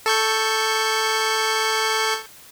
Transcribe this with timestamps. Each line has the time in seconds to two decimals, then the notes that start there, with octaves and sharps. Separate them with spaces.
0.06 A4 C#6 G6